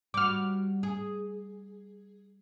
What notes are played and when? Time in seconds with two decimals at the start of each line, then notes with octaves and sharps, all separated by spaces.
0.14 G3 F#4 D6 F6
0.83 G#4